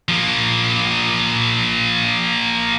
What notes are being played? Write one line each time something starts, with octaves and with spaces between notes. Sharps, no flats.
F3 A#3